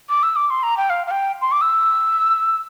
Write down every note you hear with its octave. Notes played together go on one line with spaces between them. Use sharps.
D6
E6
D6
C6
A#5
G5
F5
F5
G5
C6
D6
E6